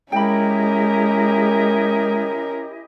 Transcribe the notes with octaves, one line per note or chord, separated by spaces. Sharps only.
G#3 C#4 E4 G4 A#4 D#5 G5 B5